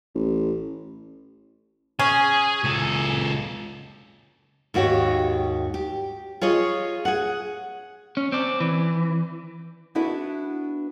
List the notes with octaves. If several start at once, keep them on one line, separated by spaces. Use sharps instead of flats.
A1
C#4 G#4
C#2 A4
D#2 G#2 F#4 G4 C#5
G4
F4 G#4 C#5 D#5
G#4 F#5
C#4
C4 D5
E3
B3 D4 E4 F#4 B4